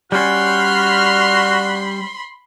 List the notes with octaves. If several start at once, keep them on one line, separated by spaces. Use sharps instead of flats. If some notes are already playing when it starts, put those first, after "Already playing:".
G3 C#4 F#4 B5 C6 F6